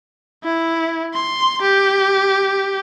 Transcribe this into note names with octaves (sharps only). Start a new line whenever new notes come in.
E4
C6
G4